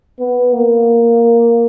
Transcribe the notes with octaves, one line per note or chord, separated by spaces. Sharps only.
B3
A#3